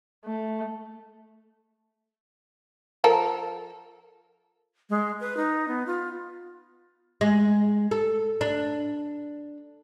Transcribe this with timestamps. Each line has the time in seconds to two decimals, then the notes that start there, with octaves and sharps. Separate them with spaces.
0.25 A3
3.04 F3 A4 A#4
4.90 G#3
5.20 B4
5.37 D#4
5.68 B3
5.87 F4
7.21 G#3
7.91 A4
8.41 D4